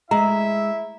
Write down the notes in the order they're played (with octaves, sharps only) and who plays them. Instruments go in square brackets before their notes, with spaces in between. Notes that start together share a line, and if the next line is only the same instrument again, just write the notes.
[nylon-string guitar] G#3 [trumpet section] E4 E5 [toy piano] A#5